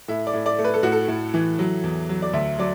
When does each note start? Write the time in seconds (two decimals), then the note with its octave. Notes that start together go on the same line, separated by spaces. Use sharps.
0.08 A2 E5
0.27 D5
0.33 A2
0.46 D5
0.58 A3
0.64 B4
0.74 A4
0.83 A2 F#4
0.92 A4
1.08 A2
1.34 E3
1.59 F#3
1.84 E2
2.09 F#3
2.22 D5
2.33 D2 E5
2.59 F#3 D5